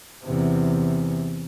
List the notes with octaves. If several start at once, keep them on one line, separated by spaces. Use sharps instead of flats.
E2 C3